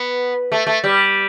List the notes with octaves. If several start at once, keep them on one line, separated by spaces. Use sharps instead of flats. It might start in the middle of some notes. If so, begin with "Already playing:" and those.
Already playing: B3
A3
A3
G3